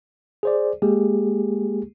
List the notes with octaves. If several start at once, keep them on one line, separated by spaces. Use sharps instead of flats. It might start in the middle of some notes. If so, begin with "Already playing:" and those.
G#4 C5 D5
G#3 A#3 G4 G#4